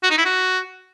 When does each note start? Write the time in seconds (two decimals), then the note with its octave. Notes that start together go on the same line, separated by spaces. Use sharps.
0.03 F#4
0.11 D#4
0.18 E4
0.25 F#4